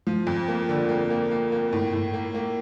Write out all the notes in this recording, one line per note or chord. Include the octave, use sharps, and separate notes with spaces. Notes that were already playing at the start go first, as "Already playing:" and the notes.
F3
F2
A#3
D3
A#3
A#3
A#3
A#3
A2
A2
A#3
A#3